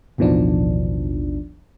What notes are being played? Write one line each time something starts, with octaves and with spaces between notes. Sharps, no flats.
A1 D#2 B2 D#3 F3 D4